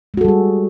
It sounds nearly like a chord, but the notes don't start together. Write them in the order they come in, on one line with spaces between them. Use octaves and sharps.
G#3 F#4 A4 G3 G#4